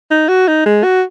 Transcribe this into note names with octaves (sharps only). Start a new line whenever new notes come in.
D#4
F#4
D#4
G#3
F#4